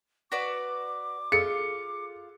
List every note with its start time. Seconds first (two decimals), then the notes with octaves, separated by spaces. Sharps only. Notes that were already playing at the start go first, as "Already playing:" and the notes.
0.32 F#4 B4 D5 D6
1.32 F4 G#4 A4 C#7